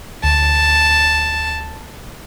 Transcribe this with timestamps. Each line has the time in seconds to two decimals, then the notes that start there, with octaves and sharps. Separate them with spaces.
0.24 D2 A5